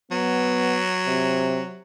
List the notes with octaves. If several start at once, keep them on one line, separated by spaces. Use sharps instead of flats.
F#3 B3
C3